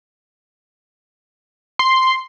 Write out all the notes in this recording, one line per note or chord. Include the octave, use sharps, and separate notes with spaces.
C6